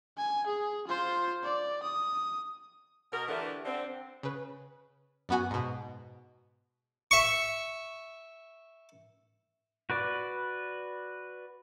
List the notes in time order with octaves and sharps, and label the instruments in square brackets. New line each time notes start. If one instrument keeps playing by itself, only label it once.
[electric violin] G#5
G#4
F4 C5
D5
D#6
[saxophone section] B2 A#4
D3 E3 A3 D4 G4
D3 C4
[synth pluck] C#3 B4
F#2 B3 F#4 G#5
G#2 B2
[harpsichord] E5 C#6
[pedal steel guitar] F#4 B4 D5